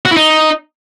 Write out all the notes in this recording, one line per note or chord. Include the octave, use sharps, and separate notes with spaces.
F#4
E4
D#4